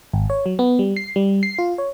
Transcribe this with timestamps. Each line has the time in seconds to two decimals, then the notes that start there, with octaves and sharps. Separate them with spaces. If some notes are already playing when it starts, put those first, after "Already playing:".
0.13 G#1
0.30 C#5
0.46 F#3
0.59 B3
0.79 G3
0.96 C7
1.16 G3
1.43 C7
1.59 F4
1.78 C#5